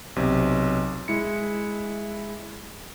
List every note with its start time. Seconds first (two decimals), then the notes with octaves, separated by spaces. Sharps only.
0.16 B1 C3
1.08 G#3 E4 C#7